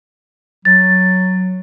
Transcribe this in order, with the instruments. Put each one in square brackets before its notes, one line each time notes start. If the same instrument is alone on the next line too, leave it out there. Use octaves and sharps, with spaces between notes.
[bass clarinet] F#3 [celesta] A6